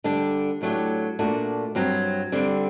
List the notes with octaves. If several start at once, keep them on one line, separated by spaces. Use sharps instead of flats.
D3 G3 D4
A2 F#3 A3 D4 G4
A#2 A3 D4 F#4
G2 F#3 C4
D3 G3 C4